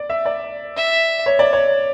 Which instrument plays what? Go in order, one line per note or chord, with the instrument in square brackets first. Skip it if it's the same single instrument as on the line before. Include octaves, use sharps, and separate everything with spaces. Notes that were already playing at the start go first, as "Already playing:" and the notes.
Already playing: [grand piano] D5
E5
D5
[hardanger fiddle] E5
[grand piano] C#5
D5
C#5